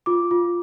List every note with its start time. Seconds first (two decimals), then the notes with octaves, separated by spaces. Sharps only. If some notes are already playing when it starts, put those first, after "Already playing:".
0.06 F4 D6
0.31 F4